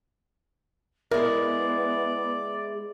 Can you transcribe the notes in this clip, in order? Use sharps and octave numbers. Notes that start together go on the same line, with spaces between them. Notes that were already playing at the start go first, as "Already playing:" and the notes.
G#3 B3 E4 A#4 D5